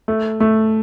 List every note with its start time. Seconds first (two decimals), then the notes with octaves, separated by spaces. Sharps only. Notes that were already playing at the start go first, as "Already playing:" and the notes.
0.08 A3
0.40 A3